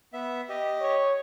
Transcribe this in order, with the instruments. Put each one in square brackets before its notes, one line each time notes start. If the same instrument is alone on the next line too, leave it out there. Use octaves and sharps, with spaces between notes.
[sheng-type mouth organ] B3 E5
G4 D#5
[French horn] C#5